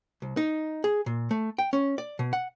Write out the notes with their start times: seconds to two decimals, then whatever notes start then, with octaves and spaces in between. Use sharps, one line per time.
0.22 C2
0.37 D#4
0.84 G#4
1.06 A#2
1.31 A3
1.58 G5
1.73 C#4
1.98 D5
2.19 B2
2.33 F#5